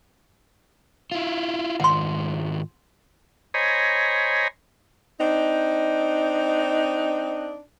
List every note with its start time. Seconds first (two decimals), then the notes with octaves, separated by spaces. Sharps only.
1.12 E4 F4
1.80 G#2 D#3 F4 F#5 C6
3.54 C5 C#5 D#5 G#5 A#5 B5
5.20 C4 D4 D#4